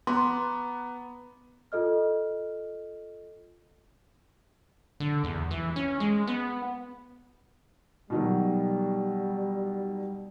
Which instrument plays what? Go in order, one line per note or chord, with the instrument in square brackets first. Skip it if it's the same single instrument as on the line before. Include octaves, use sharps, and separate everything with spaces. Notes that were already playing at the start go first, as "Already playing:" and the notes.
[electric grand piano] B3 [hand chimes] A#5 D6 [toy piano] C6
[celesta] F4 A4 D#5 F6
[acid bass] D3
E2
E3
C#4
G#3
B3
[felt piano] B2 D#3 F#3 [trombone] G3